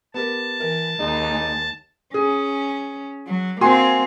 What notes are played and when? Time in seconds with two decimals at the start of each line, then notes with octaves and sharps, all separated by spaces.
0.14 B3 G4 A#4 A5
0.60 E3 A#4
0.99 D#2 G#3 D#4
2.14 C#4 G#4
3.27 F#3
3.61 A#3 C4 F#4 G#5 C6